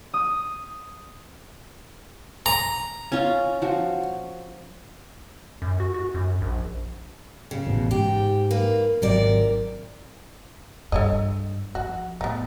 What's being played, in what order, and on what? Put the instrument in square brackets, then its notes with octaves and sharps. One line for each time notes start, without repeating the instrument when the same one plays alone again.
[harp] D#6
[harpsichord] A#5
[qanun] C#4 F4
F3 F#4
[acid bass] F#2
F#4
F#4
F#2
A#1
[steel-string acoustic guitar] C#3
[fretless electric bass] A1 B2
[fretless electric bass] G#2 [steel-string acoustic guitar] G4
[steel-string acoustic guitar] A#3 B4
[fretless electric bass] G#1 F#3 [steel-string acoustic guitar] C3 A#4 D5
[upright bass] G2 [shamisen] A4 C#5 D#5
[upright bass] F3 [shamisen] F#4
[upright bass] A2 [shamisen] B3 D#4